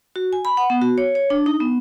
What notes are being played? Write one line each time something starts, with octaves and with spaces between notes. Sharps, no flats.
F#4
G#5
B5
F#5
B3
F#4
C#5
C#5
D4
D#4
B3